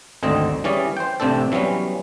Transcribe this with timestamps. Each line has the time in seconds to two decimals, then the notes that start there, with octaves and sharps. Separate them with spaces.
0.23 G#1 D2 D3 C4 D#5
0.64 E3 G3 C#4 G#4 D5
0.97 C5 G5
1.20 A1 C3 C4 D4 A4
1.52 E3 F#3 G3 B3 C#4